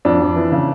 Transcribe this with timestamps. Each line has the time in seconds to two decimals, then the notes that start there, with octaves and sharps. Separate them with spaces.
0.05 F2 D4
0.21 F2
0.36 E3
0.52 C#3